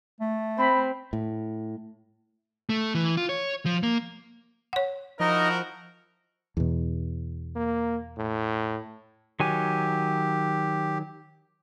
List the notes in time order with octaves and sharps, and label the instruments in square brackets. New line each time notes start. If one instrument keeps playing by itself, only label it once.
[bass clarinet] A3
[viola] C4 [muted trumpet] B5
[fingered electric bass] A2
[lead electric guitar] A3
E3
F4
C#5
F3
A#3
[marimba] C#5 F#5
[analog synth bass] F3 [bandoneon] D#4 D#5 [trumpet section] E4 F#4 A#4
[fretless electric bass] E2 B2
[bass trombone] A#3
A2
[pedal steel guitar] D#3 F#3 G#5 [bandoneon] G4